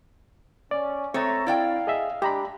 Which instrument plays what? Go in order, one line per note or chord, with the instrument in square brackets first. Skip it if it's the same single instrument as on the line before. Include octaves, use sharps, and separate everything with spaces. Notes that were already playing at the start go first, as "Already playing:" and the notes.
[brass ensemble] C#4 [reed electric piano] D5
[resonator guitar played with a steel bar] G#3 A3 C#5 [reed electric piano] C4 A6 [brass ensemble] E5 A#5
[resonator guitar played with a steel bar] E4 D5 G5 [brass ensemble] F5
[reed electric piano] G#4 D#5 E5
[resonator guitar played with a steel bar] G#3 [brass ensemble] D4 [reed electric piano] G4 A#5 B5